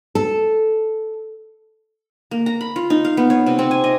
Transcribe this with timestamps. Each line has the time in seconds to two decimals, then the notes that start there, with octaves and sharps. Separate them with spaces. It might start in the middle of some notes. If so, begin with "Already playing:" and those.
0.15 A4
2.31 A#3
2.46 A#5
2.61 B5
2.76 F4
2.90 D#4
3.05 F5
3.17 B3
3.30 C#5
3.46 C3
3.59 C4
3.71 G#5
3.84 D#5